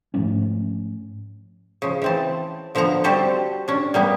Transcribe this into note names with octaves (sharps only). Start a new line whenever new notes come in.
G#2 F3 A3 C#4
C#3 F3
E3 C4 A5
D3 F3 B3 F#5 A#5
G3 C4 F#4 G4 A4 C5
C#4 D4
G3 A#3 B3